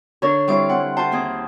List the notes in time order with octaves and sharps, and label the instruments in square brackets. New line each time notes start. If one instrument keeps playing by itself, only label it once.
[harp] D3 D4 A#4 [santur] C#5
[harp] G3 F5 D6 [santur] C4 E4 C#5
[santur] C4 [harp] F#5
[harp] F4 C5 [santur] A5
[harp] D#2 C4 G#4